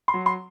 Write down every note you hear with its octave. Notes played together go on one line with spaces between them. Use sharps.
C6
F#3
C6